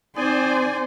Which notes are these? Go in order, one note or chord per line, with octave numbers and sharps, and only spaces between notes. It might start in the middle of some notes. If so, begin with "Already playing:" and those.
C4 D#4 C5 D5 G#5